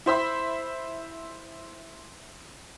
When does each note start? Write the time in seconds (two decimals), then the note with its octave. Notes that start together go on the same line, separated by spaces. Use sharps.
0.06 E4 C5 E5 B5